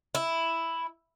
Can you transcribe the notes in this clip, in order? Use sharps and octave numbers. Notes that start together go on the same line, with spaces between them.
E4